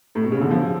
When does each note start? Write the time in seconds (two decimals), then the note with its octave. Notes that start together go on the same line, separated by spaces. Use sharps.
0.15 A2
0.23 B2
0.32 C#3
0.41 D3
0.51 F3